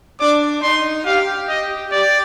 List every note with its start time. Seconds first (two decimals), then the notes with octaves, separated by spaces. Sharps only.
0.20 D4 D6
0.63 D#4 C6
1.06 G4 F5
1.48 D#5
1.91 G4 D5